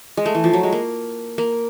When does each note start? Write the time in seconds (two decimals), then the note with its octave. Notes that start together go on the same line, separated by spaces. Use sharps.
0.17 G#3
0.26 A3
0.35 E3
0.44 F3
0.53 F#3
0.63 G#3
0.72 A#3
1.38 A#3